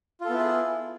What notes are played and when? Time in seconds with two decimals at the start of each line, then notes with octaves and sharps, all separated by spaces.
0.21 F4
0.25 A4
0.29 B3
0.33 E4
0.38 G#4